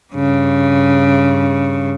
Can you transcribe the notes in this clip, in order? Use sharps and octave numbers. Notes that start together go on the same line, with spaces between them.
G2 C#3